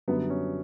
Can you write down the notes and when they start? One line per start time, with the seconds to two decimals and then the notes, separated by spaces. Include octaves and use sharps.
0.08 F#2 D3 G3 B3
0.30 C#4